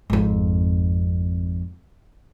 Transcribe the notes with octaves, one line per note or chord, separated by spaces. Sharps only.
G#1 F2